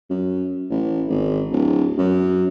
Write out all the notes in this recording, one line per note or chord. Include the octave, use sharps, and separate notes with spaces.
F#2
A1
G#1
D1
F#2